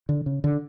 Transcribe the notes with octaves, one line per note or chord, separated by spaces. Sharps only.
D3
C#3
D3